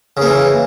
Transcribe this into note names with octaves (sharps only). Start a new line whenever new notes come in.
C#3 E3 A#3